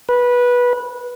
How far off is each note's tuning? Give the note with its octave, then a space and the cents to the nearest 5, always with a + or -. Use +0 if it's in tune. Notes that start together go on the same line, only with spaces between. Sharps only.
B4 -15